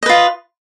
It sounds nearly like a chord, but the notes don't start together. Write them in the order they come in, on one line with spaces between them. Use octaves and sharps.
D#5 B4 F4